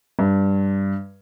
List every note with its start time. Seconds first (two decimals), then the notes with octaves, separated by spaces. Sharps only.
0.19 G2